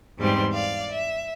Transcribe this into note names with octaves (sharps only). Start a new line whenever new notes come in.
E2 G#2 G3 C4 C6
D5 F5
E5